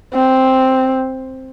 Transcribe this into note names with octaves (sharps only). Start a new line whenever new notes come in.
C4